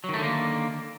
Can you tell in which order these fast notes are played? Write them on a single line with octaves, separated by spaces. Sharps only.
F#3 D#3 A3 D3 A#3